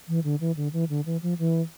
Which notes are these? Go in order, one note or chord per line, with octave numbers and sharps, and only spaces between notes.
E3
D3
E3
D3
E3
D3
E3
F3
E3